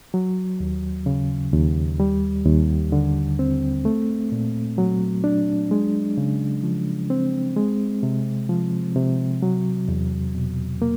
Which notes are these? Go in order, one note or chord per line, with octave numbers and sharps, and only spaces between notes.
F#3
D#2
C#3
D#2
G3
D#2
D3
C4
A3
A#2
F#3
D4
G#3
C#3
F3
C4
G#3
C3
F3
C3
F#3
E2
B2
A#3